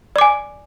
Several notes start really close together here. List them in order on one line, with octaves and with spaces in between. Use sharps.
D5 D6 G#5